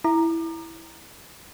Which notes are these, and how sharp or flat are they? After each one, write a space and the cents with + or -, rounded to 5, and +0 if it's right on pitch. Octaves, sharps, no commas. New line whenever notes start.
E4 +0 A#5 +0 D6 +40